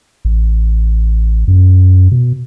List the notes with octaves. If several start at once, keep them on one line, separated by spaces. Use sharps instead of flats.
A1
F#2
B2